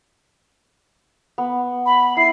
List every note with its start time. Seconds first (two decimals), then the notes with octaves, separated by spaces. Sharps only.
1.38 B3
1.86 B5
2.17 E4 C7